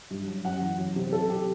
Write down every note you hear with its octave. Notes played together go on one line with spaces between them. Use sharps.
G2
F#3
F#2 F#5
E3
F#3
C3
F#3 A4
C3 G4